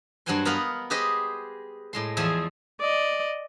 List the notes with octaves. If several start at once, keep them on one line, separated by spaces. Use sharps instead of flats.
G2 F#3 C5 F#5 G#5 C6
B3 A#4 B4 D#5 F5 F#5
G4 G#4 B4 C5 D#5
A2 G#3 C6
E2 F3 G#4 C5 E5 G#5
D5 D#5